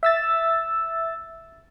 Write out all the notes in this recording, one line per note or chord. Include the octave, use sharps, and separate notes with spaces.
E5 E6 A6